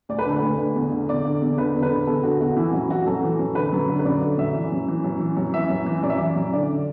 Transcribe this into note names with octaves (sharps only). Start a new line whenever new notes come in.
D2 D5
B4
D3 A4
D2 B4
D3
E2
D3
E2 D5
D3
E2
D3 B4
E2
B4
D3
E2 A4
D3 F#4
E2 F#4
E3 E4
F#2 F#4
E3 F#4
F#2 A4
E3
F#2
D3 B4
F#2
D3
B4
F#2 D5
D3
F#2 E5
E3
F#2
E3
F#2
E3
F#2
E3 E5
F#2
E3
F#2 D5
E5
E3 D5
F#2
D3 D5